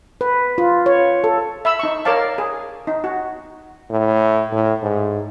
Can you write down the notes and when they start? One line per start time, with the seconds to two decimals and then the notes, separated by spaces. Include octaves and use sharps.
0.21 B4
0.58 F4
0.86 C#5
1.24 A4
1.65 E5 B5 E6
1.79 D#4 C#6
2.05 A#4 C#5 D5 F5 A5
2.38 G#4
2.87 D#4
3.04 F#4
3.90 A2
4.52 A2
4.82 G#2